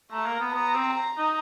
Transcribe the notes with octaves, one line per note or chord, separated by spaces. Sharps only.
A3 A#5
A#3
B3
B3 A#5
C4
A#5
D#4